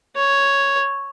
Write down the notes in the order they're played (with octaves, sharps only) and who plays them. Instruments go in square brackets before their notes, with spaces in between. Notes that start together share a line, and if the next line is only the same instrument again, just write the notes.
[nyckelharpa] C#5